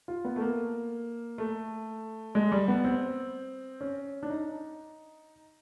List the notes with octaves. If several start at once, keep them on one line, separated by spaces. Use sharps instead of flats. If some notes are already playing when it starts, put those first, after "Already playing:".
F4
B3
A3
A#3
A3
G#3
G3
B3
C4
C#4
D4
D#4